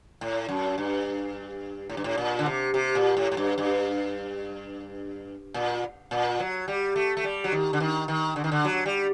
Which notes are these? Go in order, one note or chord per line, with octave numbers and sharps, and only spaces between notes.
A2
F#2
G2
A2
G2
A2
A#2
D3
C3
C3
A#2
A2
A2
G2
G2
A#2
A#2
F#3
G3
A3
A3
G3
F#3
D#3
D3
D#3
D#3
D3
D#3
D3
F#3
G3